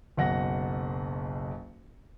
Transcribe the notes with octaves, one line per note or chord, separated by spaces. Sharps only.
F#1 B1 F#5 A#6